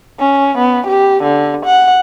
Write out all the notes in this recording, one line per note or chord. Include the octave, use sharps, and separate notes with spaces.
C#4
B3
G4
D3
F#5